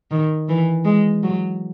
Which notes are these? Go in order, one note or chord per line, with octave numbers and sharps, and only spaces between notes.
D#3
E3
G#3
F#3